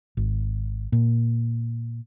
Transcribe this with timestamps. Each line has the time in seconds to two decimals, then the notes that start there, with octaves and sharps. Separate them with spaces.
0.17 G#1
0.92 A#2